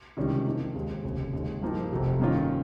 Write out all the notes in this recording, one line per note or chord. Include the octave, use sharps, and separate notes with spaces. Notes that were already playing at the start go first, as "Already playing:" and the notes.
C#2 C3 D#3 G3 C#4
F2 D#3 A#3 D#4
D#2 D#3 G#3 C4
F1 D#2 C#3
D#2 D#3 G#3
G2 F3 A#3 D#4 G4
F1 F2 C3
G2 D#3 A#3 C#4 F4